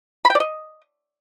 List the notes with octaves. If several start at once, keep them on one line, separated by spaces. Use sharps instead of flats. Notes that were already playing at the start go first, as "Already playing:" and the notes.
B5
G5
D5
D#5